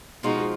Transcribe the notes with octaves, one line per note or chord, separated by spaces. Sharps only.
B2 F3 G#3 D#4 F4 F#4